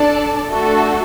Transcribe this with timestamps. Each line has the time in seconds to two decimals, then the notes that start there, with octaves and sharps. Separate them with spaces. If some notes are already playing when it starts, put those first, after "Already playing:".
Already playing: D4 A4 D5 A5
0.50 A3 D4 F#4 A4